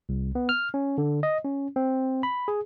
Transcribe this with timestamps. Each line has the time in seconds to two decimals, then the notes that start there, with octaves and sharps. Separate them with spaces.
0.09 C2
0.35 B3
0.49 F6
0.74 C#4
0.98 D3
1.23 D#5
1.45 C#4
1.76 C4
2.23 B5
2.48 G#4